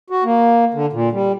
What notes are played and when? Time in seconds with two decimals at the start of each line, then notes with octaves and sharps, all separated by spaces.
0.10 F#4
0.24 A#3
0.74 D3
0.93 A#2
1.12 G3